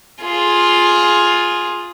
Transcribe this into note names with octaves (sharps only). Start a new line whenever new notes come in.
F4 G#4